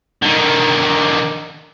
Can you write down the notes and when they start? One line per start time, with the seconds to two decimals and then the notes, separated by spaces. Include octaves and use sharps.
0.22 D3 D#3